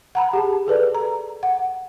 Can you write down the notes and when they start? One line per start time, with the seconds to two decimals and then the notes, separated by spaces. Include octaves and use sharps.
0.15 F#5 A#5 B5
0.33 G4 G#4 A5
0.67 G#4 A4 B4 D5
0.95 A#5
1.43 F#5